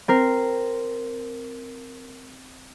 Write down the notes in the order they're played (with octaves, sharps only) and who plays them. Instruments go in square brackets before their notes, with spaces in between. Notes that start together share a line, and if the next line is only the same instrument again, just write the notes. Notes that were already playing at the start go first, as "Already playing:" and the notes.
[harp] C4 A#4 C7